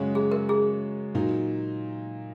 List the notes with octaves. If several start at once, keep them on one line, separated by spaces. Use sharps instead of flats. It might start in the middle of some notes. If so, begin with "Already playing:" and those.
Already playing: F#2 C#3 G#3 F#4 C#5
G#4
A#4
G#4
A#2 F#3 D#4